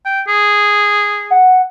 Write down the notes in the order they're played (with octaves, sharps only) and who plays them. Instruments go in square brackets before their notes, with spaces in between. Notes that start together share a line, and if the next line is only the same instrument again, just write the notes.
[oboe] G5
G#4
[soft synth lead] F#5